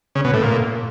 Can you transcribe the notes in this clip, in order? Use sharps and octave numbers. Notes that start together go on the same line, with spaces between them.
C#3
B2
A2
A#2